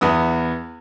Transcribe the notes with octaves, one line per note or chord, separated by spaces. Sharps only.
E2 B3 D#6